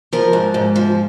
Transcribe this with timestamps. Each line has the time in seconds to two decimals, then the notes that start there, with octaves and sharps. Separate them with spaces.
0.13 F3 A#4
0.33 G#2
0.54 G#2
0.76 F3